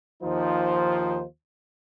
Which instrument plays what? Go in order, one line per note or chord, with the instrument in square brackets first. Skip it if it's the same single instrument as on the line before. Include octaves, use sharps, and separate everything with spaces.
[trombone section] D#2 F3 D#4 F4 C5